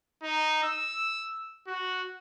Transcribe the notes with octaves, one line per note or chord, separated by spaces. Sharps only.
D#4
E6
F#4